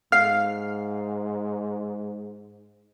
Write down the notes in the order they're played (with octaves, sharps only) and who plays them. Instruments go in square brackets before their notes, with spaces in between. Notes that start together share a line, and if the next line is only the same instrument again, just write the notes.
[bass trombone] G#2 [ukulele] F5 [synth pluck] F6 C7